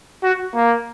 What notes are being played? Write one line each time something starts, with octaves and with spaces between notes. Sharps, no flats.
F#4
A#3